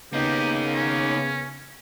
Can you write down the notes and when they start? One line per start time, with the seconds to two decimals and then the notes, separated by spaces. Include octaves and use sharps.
0.13 C#3 A#3 B3 D#4 G4
0.75 C#4